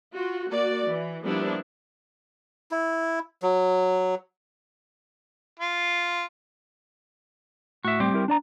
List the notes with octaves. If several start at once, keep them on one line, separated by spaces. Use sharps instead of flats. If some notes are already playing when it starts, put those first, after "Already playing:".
F4 F#4
A#3 F#4 D5
E3
F3 G3 A#3 B3 D4 E4
E4
F#3
F4
A2 F#4 E5
G3 C4 G4
E4 A#4
D4 D5 A#5